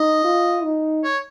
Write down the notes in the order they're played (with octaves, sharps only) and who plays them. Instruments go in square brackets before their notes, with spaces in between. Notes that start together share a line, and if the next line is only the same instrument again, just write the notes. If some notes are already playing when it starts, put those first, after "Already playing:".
Already playing: [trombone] D#4 [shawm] D#5
[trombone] F4
D#4
[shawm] C#5